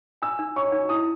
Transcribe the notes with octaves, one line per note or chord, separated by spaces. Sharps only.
G#5 E6
D#4
C#5 C#6
D#4
E4 D#6